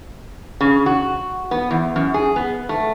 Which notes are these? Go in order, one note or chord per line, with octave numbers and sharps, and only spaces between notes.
C#3
F#4
B3
E2
F#2
G#4
B3
A3